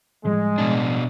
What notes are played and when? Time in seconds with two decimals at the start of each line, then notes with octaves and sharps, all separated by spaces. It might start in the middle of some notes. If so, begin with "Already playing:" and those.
0.25 A2 F3 G3 G#3
0.58 B2 D4